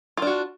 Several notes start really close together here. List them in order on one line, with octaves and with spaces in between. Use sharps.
F4 D4 F#4